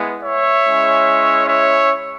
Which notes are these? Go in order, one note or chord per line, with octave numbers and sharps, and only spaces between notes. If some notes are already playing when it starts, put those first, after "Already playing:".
Already playing: G#3 B3 E4
C#5 E5
G#3 C#4 E4
C#5 E5